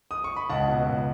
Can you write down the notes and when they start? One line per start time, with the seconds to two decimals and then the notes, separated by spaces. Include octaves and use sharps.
0.11 D#6
0.24 C#6
0.37 B5
0.49 C#2 F#5 A5
0.68 B2
0.87 C#2